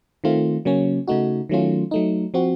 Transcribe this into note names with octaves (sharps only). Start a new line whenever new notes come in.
D#3 A3 C4 F4
C#3 F#3 A#3 C#4
C#3 A3 D#4 F#4
D#3 F#3 A3 C#4 F4
F#3 A3 D#4
F3 C4 F#4